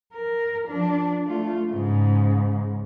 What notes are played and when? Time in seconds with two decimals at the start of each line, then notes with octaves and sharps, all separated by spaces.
0.14 A#4
0.68 F3 D4
1.26 A3 F4
1.69 G#2 C#3